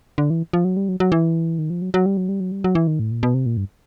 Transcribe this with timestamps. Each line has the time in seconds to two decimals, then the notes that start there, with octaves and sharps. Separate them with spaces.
0.18 D3
0.30 E3
0.53 F3
0.65 F#3
0.77 G3
0.89 F#3
1.00 F#3
1.12 E3
1.59 D#3
1.70 F3
1.82 F#3
1.94 F#3
2.06 G3
2.17 F#3
2.29 G3
2.40 F#3
2.52 G3
2.64 F#3
2.75 E3
2.87 D#3
2.99 A2
3.11 A#2
3.23 B2
3.34 C3
3.46 A#2
3.57 G2